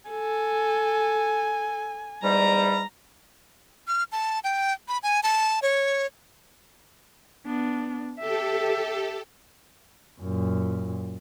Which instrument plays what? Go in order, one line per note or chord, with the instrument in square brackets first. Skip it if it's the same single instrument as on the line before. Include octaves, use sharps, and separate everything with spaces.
[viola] A4 [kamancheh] G#5
[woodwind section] E2 G#2 G3 [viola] A#5
[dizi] F6
A5
G5
B5
G#5
A5
C#5
[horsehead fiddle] B3 D4
[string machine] G4 A4 [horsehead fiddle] E5
[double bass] F#2 A#2